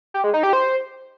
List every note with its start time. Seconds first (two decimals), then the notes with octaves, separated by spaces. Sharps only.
0.14 G4
0.24 G#3
0.34 D#4
0.43 G4
0.53 C5